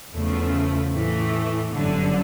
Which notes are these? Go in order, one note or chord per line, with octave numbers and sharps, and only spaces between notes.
E2 C#3 F3 A3
A2 E3 A3
G1 F#2 D3 F#3